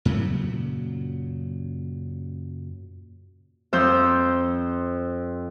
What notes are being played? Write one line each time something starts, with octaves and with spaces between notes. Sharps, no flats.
F#2 A#2 C#3 F#3
F2 C5 E6 G6